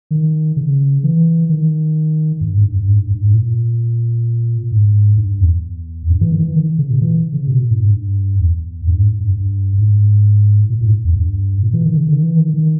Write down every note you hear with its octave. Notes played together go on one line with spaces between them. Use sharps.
D#3
C#3
E3
D#3
G2
G#2
G2
G2
G#2
G2
G2
G#2
A#2
G#2
G2
E2
G2
E3
D#3
E3
D#3
C#3
A#2
E3
C#3
B2
A#2
G2
G#2
G2
E2
G2
G#2
G2
G2
G#2
A#2
G#2
E2
G2
A#2
E3
D#3
C#3
D#3
E3
D#3
D#3